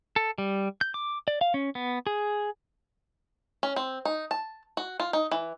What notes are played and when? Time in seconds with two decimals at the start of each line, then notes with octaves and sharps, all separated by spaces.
0.16 A4
0.38 G3
0.81 G6
0.94 D6
1.28 D5
1.41 F5
1.54 C#4
1.75 B3
2.07 G#4
3.63 C#4
3.76 C4
4.05 D#4
4.31 A5
4.77 F#4
5.00 F4
5.13 D#4
5.31 E3